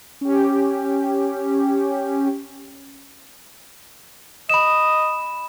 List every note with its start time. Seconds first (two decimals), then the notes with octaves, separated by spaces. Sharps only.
0.21 C#4 G4
4.50 D#5 B5 E7